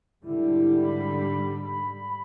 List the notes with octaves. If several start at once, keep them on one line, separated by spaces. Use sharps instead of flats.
G#2 D3 G3 E4
B5